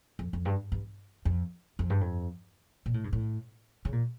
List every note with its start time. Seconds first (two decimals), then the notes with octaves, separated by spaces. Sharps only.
0.19 F2
0.33 F2
0.45 G2
0.72 G2
1.25 F2
1.79 F2
1.90 G2
2.01 F2
2.86 A#2
2.94 A2
3.04 G2
3.13 A2
3.85 C#3
3.92 A#2